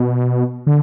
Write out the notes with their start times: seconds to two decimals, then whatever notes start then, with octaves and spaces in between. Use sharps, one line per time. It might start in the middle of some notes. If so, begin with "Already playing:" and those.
Already playing: B2
0.67 D3